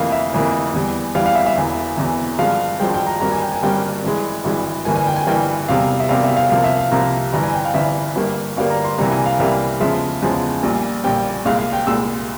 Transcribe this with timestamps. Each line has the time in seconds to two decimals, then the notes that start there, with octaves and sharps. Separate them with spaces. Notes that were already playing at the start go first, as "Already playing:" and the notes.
Already playing: F1 F2 E3 A#3 F5
0.12 E5
0.33 F1 F2 E3 A#3
0.73 E2 E3 G3
1.14 E2 E3 G3 F5
1.26 F5
1.35 E5
1.46 E5
1.56 E1 E2 E3
1.97 E1 E2 E3
2.39 G#1 G2 F3 G#3 F5
2.79 G#1 G2 F3 G#3 G5
2.94 G5
3.07 A#5
3.21 G#1 G2 G3 A#3 A#5
3.32 G#5
3.42 G5
3.52 G#5
3.63 G#1 G2 G3 A#3 G5
4.04 G#1 G2 E3 G#3
4.44 G#1 G2 E3 G#3
4.85 G1 G2 E3 A#3 G#5
4.96 G#5
5.07 G5
5.16 G#5
5.27 G1 G2 E3 A#3 G5
5.68 E1 E2 C3 G3 F5
6.00 E5
6.09 E1 E2 C3 G3 F5
6.24 E5
6.36 F5
6.51 C2 C3 F3 A#3 F5
6.64 E5
6.78 F5
6.92 C2 C3 F3 A#3 A#5
7.33 G1 G2 E3 A#5
7.43 G#5
7.54 G5
7.65 F5
7.74 G1 G2 E3 E5
8.16 G1 G2 G3 A#3
8.57 G1 G2 G3 A#3 F5
8.70 A#5
8.85 C6
8.98 C2 C3 E3 G3 A#3 A#5
9.12 G#5
9.26 F5
9.39 C2 C3 E3 G3 A#3 E5
9.80 E2 C#3 F3 G#3 E5
10.22 E2 C#3 F3 G#3
10.63 A#1 A#2 G3
11.04 A#1 A#2 G3 G5
11.45 C2 A#2 G#3 F5
11.59 F5
11.73 G5
11.87 C2 A#2 G#3 E6